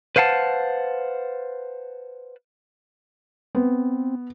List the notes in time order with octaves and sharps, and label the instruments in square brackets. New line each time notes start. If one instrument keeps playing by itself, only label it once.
[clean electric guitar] B4 C5 F5 F#5 A5
[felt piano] B3 [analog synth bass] C4